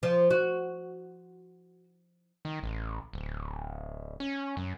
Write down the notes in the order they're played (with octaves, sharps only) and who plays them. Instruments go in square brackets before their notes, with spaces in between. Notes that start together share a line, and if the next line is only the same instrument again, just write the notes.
[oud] F3
F#4
[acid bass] D#3
A1
D1
C#4
F#2